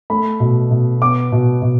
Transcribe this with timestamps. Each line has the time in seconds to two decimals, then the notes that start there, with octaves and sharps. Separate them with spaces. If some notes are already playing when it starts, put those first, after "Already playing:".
0.10 A3 B5
0.40 B2
0.71 B2
1.02 B3 D6
1.32 B2
1.62 B2